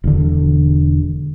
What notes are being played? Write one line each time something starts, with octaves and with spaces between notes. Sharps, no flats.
E1 D3